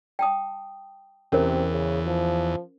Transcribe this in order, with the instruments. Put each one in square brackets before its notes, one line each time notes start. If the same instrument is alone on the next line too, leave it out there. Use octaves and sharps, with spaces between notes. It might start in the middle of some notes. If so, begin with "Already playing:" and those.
[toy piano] G5 A5 D#6
[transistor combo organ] E2 [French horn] C3 [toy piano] C#4 A#4 C5
[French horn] C#3
F3